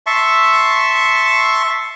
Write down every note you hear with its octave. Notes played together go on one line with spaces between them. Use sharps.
E5 A5 C6 C#6